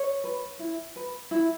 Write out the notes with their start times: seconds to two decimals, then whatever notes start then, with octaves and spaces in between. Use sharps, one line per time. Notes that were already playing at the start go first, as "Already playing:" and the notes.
Already playing: C#5
0.24 B4
0.59 E4
0.96 B4
1.31 E4